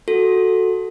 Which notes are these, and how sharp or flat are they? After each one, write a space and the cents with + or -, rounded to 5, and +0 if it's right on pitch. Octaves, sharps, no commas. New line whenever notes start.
F#4 +0 A4 +0